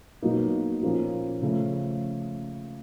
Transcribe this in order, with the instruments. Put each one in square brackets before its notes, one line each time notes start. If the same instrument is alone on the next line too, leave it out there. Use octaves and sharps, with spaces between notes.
[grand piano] B2 F#3 A#3 D#4
A#2 F3 A#3 C#4
C#3 F3 A3